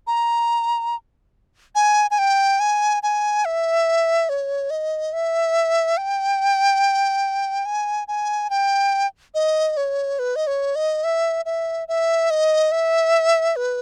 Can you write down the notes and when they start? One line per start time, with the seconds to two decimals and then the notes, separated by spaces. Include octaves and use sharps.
0.07 A#5
1.75 G#5
2.11 G#5
2.19 G5
2.60 G#5
3.03 G#5
3.45 E5
4.29 C#5
4.70 D#5
5.13 E5
5.97 G5
7.66 G#5
8.08 G#5
8.50 G5
9.34 D#5
9.77 C#5
10.19 B4
10.36 D#5
10.47 C#5
10.76 D#5
11.04 E5
11.45 E5
11.88 E5
12.30 D#5
12.72 E5
13.56 B4